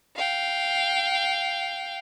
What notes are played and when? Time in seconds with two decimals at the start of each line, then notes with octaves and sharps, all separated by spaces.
0.16 F5 G5